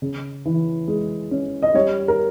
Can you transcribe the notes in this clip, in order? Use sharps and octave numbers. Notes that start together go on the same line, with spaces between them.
C#3
E3
G#3
C#4
D#5
G3 C#5
A#4